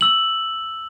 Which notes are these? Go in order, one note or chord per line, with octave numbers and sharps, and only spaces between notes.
E6 F#7